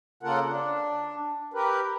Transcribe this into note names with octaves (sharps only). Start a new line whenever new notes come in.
C#3 A#3 F4 A4 A#4 F#5
D4
G4 A#4 B4